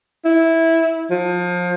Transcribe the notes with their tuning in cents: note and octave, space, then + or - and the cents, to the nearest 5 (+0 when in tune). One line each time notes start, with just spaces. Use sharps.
E4 -10
F3 +30